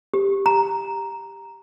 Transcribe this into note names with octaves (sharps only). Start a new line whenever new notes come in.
G4
A#5